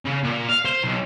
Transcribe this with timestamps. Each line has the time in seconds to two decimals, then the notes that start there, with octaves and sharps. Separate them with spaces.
0.05 C#3
0.24 A#2
0.49 F5
0.65 C5
0.84 B1